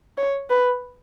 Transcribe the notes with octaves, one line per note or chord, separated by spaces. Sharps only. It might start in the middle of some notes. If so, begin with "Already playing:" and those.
C#5
B4